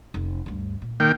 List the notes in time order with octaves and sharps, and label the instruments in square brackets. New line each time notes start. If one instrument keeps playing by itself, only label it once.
[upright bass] F1
D2 G2
A#2
[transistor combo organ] D#3 A#3 G5